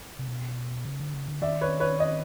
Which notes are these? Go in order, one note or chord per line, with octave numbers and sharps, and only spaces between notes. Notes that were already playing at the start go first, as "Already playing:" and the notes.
C3
B2
C#3
D3
C#3
D3
D#3 D5 E5
B4 C#5
B4 C#5
C#5 D#5